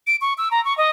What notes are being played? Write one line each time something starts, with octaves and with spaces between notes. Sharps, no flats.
D7
C#6
E6
A#5
C#6
D#5